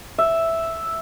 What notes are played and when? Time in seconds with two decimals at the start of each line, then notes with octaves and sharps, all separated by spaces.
0.18 E5